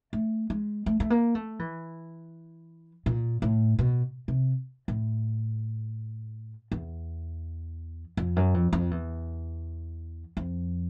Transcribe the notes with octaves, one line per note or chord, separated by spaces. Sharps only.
A3
G#3
A3
A3
A#3
A3
E3
A#2
A2
B2
C3
A2
E2
F2
F#2
F2
F2
E2
F2